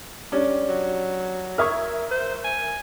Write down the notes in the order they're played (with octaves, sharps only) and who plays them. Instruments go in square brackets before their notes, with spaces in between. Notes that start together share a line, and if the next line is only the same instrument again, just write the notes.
[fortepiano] G3 C#4 D4
[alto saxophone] F#3
[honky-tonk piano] A#4 E5 G#6 [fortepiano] C#6 D#6 F6
[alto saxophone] C5
G#5